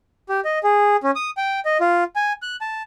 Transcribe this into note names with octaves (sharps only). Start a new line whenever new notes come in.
G4
D#5
G#4
C#4
D#6
G5
D#5
F4
G#5
F#6
A5